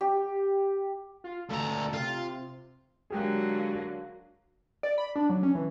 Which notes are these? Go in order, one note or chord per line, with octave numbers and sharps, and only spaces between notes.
G4
F4
D2 A4 A#5
C3 F4
D3 F#3 G#3 A#3 G4 G#4
D5
B5
D4
F#3
C#4
E3